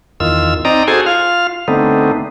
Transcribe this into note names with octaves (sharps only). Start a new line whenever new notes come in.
E2 D#3 F4 E6
C4 D#4 D5 D#5 A#5
F#4 G#4 A4 C5 G#5
F4 F5
D3 A3 B3 C4 D#4